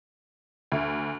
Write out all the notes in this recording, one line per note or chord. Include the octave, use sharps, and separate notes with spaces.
D2